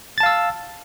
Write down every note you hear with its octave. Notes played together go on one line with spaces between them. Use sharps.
F5 A5 E6 A6